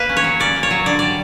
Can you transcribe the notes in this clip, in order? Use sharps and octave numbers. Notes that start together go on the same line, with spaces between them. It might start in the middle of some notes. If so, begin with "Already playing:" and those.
Already playing: A#3 B4
C#4
C#5
F#3
C#4 D5
A#3
C#5
F#3
D3 D5
G3 D5